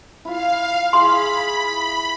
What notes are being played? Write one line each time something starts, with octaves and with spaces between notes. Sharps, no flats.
E4 F4 F5
E4 G#4 B5 C6